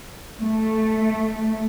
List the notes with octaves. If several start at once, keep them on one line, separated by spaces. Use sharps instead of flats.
A3